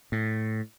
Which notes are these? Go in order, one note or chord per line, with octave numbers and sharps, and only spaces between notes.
A2